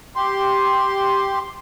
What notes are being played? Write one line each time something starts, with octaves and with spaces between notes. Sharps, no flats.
G4 C6